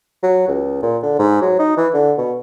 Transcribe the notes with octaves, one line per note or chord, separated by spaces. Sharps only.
F#3
C#2
A#2
D3
G#2
F#3
D#4
E3
D3
B2